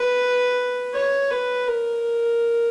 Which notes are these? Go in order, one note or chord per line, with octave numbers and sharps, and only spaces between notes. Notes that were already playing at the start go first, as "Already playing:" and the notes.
Already playing: B4
C#5
B4
A#4